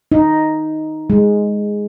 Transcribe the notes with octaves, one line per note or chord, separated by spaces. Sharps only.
D#4
G#3